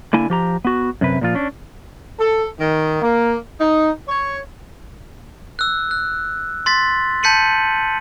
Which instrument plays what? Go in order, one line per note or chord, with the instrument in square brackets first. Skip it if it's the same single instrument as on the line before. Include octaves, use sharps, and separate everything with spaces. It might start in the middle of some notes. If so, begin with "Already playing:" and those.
[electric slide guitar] D3 A#3 E4 G#5
F3 G4 A#5
B3 F#4
F#2 C3 B4
A#2 F3 F4
C#4 D4
[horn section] A4
D#3
A#3
D#4
C#5
[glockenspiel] E6 F#6
F#6
C6 A6 B6
A5 G6 B6 C#7 D#7 F#7